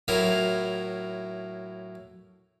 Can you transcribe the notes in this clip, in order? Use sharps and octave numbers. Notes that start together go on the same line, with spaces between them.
A2 F#3 E4 F4 A#4